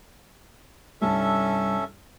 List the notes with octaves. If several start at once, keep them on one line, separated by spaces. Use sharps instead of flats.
C2 G2 C#4 A4 E5 A5